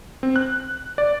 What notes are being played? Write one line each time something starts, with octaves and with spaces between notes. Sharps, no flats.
C4
F#6
D5